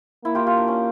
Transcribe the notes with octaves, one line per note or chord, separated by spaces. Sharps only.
A#3 E4
F4 G4
F4 G4
D4
C#4